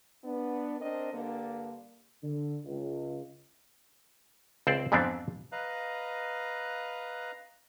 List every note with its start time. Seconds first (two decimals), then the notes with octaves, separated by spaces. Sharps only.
0.24 B3 D4
0.80 C4 D4 A#4 D#5
1.13 G2 D3 A#3
2.23 D3
2.65 C#2
4.67 C#2 C4 C5 D5
4.92 F2 G#2 E3 B3 C4 D4
5.52 B4 D#5 F5 A#5 F#6